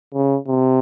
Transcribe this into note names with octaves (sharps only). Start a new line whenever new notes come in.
C#3
C3